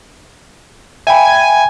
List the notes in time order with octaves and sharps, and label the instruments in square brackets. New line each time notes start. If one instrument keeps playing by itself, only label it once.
[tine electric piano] E5 G5 B5 [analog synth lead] G#5